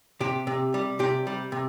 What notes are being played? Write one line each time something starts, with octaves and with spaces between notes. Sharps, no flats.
C3 G4
C3
G3
C3 G4
G3
C3